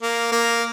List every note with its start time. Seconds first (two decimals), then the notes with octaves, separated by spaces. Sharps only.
0.03 A#3
0.32 A#3